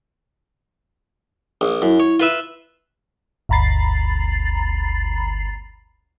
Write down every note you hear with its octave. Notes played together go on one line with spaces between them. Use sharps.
A#1
F#2 E4
C#5
F4 B4 E5
G1 D2 A#5 B5 A6 C7